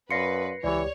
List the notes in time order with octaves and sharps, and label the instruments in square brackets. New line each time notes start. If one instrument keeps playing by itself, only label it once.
[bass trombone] F#2 [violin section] B4 [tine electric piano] D5 F5 C6 [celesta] A#6 C7 C#7
[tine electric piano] C#2 G4 [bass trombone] E3 [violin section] C#5 [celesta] D5